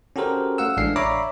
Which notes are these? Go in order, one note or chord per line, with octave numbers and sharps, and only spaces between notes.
C#4 F#4 G4 A4 A#4 C5
A3 F5 F#5 E6
A1 G#3 D4 G#4 F5 C7
C#5 D5 E5 A#5 B5 D6